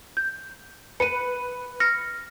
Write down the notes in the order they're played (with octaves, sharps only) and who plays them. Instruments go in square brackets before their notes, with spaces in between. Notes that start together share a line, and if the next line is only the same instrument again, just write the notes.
[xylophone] G6
[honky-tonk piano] B4 [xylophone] C#7 D#7
[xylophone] F6 A#6 C#7